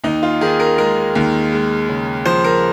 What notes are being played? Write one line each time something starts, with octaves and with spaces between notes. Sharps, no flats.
D#2 D#4
F4
D#3 G#4
A#4
G#3 A#4
D#2
G#3
C#3
F3 C5
A#4